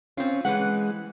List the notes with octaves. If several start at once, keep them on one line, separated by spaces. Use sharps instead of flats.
C4 C#4 F4
E3 G#3 B4 F#5